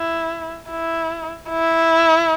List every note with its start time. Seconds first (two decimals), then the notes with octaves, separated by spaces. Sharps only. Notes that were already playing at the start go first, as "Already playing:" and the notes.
Already playing: E4
0.70 E4
1.50 E4